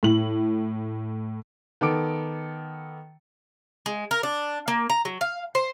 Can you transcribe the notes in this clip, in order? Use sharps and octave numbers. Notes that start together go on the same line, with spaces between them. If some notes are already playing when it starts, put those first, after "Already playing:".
A2 F#7
D#3 B3 A4 D6 D7
G#3
A#4
D4
A#3
A#5
F#3
F5
C5